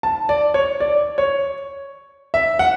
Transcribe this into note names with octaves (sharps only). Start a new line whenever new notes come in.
A5
D5
C#5
D5
C#5
E5
F#5